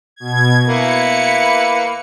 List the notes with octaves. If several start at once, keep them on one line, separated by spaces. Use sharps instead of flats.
B2 G#6
A#3 E4 B4 C#7